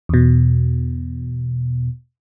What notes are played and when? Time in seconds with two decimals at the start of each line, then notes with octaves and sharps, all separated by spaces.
0.09 E2 B2